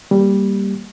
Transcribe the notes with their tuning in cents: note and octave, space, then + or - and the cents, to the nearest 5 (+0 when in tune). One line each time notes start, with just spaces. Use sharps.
G3 +0 A#3 +0